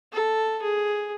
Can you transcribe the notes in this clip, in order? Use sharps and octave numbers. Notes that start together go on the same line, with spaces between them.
A4
G#4